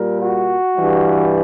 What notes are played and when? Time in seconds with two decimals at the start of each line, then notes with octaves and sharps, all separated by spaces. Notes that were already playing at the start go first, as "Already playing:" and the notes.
Already playing: A#2 G3 A#4
0.22 F#4
0.76 G2 E3 G3